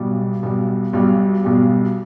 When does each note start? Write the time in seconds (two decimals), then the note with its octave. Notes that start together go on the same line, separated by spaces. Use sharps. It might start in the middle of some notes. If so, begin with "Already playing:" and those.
Already playing: B1 B2 G3
0.43 B1 B2 G3
0.93 B1 B2 G3
1.43 B1 B2 G3